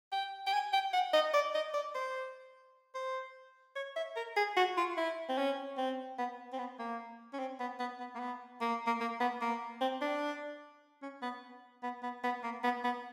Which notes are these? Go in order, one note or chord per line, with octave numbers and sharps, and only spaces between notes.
G5
G5
G#5
G5
F#5
D#5
D5
D#5
D5
C5
C5
C#5
E5
A#4
G#4
F#4
F4
E4
C4
C#4
C4
B3
C4
B3
A#3
C#4
C4
B3
B3
B3
A#3
B3
A#3
A#3
A#3
B3
A#3
C4
D4
C#4
B3
B3
B3
B3
A#3
B3
B3